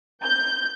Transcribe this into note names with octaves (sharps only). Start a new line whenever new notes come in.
G6